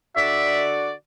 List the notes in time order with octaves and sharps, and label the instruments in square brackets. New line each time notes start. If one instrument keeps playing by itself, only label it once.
[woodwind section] D3 F#4 D5 [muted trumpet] E5